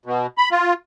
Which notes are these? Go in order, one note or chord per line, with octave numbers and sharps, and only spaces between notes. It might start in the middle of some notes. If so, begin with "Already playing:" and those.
B2
B5
F4